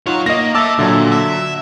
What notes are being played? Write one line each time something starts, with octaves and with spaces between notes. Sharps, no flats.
D#4 F4 C#5 F#5
A#3 D#5 A#6
E5 A5 D6 E6 A6
A#2 D3 F#3
E5